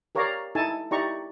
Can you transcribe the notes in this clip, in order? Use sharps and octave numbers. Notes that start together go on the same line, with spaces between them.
G4 A#4 C#5 D5 F5 A#5
D#4 E4 A4 G#5 A5
D#4 E4 G4 D5 A#5 C#6